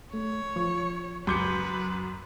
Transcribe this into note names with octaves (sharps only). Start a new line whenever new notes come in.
A3 C#5
F3 C#6
C#2 F#2 B4 C6 D6 G6 C#7